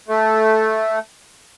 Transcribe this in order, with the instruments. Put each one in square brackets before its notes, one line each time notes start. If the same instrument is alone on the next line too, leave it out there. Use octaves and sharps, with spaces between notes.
[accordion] A3